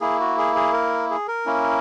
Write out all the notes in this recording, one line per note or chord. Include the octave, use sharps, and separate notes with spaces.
A#3 E4 G#4
F#4
G#4
G#4
A#4
G#4
A#4
A#3 C#4 E4